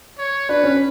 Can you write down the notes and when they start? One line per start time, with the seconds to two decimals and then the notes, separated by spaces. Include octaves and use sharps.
0.18 C#5
0.49 D4 B4
0.64 C#4